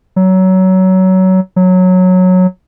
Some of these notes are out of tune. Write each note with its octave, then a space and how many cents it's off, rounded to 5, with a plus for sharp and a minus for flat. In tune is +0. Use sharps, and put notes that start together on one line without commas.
F#3 +20
F#3 -10